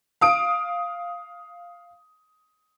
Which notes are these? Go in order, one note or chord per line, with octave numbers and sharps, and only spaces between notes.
F5 D#6 D7